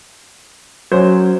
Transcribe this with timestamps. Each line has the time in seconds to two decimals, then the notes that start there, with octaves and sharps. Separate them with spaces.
0.92 F#3 C#4 C5